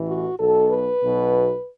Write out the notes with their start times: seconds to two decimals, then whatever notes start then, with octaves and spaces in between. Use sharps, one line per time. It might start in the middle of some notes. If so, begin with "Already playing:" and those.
Already playing: A1 A2 E3
0.08 F#4
0.39 B1 B2 A4
0.71 B4
1.02 B1 B2